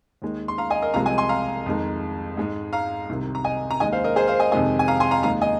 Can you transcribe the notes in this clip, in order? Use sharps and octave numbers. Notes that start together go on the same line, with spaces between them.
D#2 D#3 G#3
C6
F5 A#5
D#5 G#5
A#4 D#5
C2 C3 F3 G#3 F5 A#5
D#5 G#5
G#5 C6
F5 A#5
F2 D#3 G#3
G#2 G#3
F5 A#5
C2 C3 D#3
A#5
D#5 G#5
A#5
D#2 D#3 G#3 D#5 G#5
C5 F5
A#4 D#5
G#4 C5
C5 F5
D#5 G#5
F2 C3 D#3 G#3 D#5 G#5
G#5
F5 A#5
G#5 C6
F5 A#5
D#2 D#3 G#3 F5 A#5
D#5 G#5